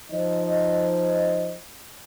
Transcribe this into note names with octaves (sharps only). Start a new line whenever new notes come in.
F3 D#4 C5 D#5